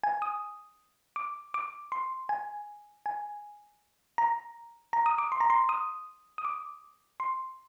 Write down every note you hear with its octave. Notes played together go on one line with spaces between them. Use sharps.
G#5
D#6
D6
D6
C6
G#5
G#5
A#5
A#5
D#6
D6
C6
A#5
C6
D#6
D#6
D6
C6